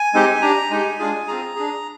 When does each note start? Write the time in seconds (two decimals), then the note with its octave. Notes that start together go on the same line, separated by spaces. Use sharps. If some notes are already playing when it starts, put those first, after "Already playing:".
Already playing: G#5
0.13 G#3 C4 D#4 G4
0.42 D4 G4 A#5
0.70 G#3 D#4 G4 G#5
0.99 G#3 D4 F4 G#4
1.27 C4 F4 G#4 A#5
1.56 D4 G#4